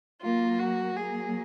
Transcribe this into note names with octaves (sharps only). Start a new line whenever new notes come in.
F#3 A#3 F4
F#4
F#3 A#3 G#4